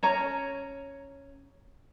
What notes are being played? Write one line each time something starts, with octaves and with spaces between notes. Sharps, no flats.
C#4 C#5 A#5